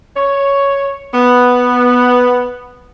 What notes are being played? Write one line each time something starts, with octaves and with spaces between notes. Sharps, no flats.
C#5
B3